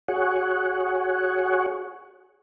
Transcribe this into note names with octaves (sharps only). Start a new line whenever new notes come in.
F#4 G#4 C#5 F#5